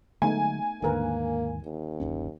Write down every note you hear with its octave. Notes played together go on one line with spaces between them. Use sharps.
D3 F#3 G#3 A3 B3 D#4 G#5
D#2 G#2 D3 D#3 A#3 A#4 B4
D#2
D1 F#2 C#4